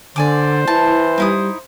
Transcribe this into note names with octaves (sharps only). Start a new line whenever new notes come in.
D3 C5 D5 G#5 D6
E3 E4 A5
G3 D#4 E4 D#6